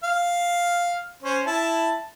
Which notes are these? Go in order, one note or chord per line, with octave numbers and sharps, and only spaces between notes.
F5
C#4 C5
E4 A5